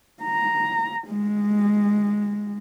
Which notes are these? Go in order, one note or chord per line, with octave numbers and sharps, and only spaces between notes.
A#5
G#3